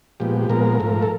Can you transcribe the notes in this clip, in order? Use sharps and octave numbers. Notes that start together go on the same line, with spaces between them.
A#2 F3 G#3 B3 G4
A#2 F3 G#3 B3 A#4
G#2 F3 A3
A4